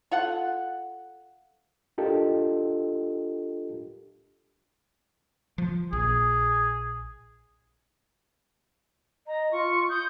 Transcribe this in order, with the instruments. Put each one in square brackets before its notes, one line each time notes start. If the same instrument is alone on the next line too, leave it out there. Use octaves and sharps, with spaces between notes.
[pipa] F4 A4 F#5
[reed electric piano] D4 F4 G4 A4 A#4 D#5
[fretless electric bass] F3
[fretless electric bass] A#1 [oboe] G#4
[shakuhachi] D#5 [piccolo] A#5
[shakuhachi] F4 [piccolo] C#6
[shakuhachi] D#6 [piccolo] G6